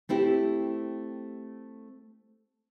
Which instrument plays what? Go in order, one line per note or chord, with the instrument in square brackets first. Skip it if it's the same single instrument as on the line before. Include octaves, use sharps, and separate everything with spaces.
[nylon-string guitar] A3 C4 E4 G4